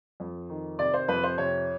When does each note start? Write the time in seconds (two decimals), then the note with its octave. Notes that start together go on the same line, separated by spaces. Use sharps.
0.20 F2
0.50 D#3
0.79 C3 D5
0.94 C5
1.08 F2 B4
1.23 C5
1.38 C3 C#5